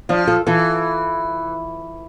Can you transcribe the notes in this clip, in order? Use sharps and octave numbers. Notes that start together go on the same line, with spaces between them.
F3 D4 F4
F4 A4
E3 F4 A4